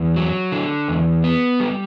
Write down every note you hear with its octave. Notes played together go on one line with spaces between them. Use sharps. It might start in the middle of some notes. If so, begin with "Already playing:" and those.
Already playing: E2
F#3
D3
E2
B3
G3